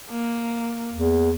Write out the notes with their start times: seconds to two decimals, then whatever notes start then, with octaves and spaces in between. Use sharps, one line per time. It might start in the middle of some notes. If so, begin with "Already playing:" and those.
0.10 A#3
0.92 E2